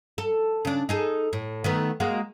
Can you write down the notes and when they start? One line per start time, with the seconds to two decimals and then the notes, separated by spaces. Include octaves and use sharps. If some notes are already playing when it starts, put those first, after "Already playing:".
0.18 A4
0.65 C#3 D4
0.89 D#4 G#4 A4
1.33 A2
1.64 D#3 A3 B3
2.00 G#3 A#3 F#4